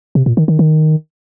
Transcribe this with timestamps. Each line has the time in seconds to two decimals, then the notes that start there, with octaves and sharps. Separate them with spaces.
0.15 C3
0.26 A#2
0.37 D#3
0.48 D#3
0.59 D#3